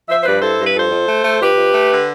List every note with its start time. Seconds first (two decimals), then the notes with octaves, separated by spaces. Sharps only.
0.09 F3 C5 E5
0.21 C5
0.26 G2 B4 D5
0.42 E4 A4 C5
0.59 G2 B4
0.76 F2 A4 C5
0.91 F2
1.09 A3
1.25 A3
1.42 F2 G4 B4
1.57 F2
1.74 A3
1.91 D3